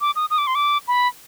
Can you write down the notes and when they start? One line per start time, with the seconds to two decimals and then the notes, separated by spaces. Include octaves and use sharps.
0.01 D6
0.16 D#6
0.30 D#6
0.38 D6
0.47 C6
0.55 D6
0.88 B5